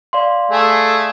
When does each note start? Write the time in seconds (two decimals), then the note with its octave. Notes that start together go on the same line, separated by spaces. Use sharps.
0.13 D5 F5 C6
0.51 A3 G#4